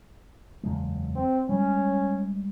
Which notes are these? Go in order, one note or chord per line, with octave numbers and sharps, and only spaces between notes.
F#1 E2 G#3
C4
G3 G#3 C#4